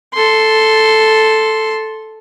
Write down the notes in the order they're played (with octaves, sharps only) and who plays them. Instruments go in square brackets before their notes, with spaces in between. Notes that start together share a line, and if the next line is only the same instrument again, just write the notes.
[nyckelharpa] A4 C6